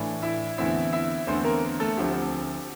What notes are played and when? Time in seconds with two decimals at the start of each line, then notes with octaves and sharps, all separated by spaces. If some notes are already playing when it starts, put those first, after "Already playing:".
Already playing: A2 E3 A3 D4
0.22 E4 E5
0.58 E2 D3 A3 C4 E4 E5
0.93 E4 E5
1.27 E2 D3 A3 C4 C5
1.44 A#3 A#4
1.80 A3 A4
1.97 D2 D3 F3 C4 G4